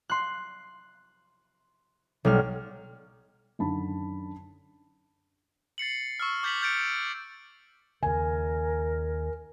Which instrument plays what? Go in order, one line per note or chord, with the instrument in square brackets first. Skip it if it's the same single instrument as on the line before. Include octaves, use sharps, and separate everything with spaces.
[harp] C6 F#6
B1 G3 F6
[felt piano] F#2 D3 D#3 A5 B5
[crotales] A6 C7 C#7 F#7
C#6 E6 F6
D6 G6 A6 B6 F7 F#7
F6 G6 A6 C#7 D7
[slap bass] D#2 C#3 [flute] A#4 [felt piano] G#5